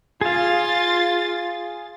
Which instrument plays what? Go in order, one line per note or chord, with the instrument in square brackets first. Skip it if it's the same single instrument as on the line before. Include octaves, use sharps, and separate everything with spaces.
[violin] F4 A6 [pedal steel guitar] G#4 F5